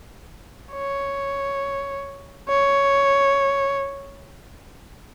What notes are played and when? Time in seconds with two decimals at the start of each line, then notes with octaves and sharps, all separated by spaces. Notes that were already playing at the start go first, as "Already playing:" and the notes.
0.73 C#5
2.50 C#5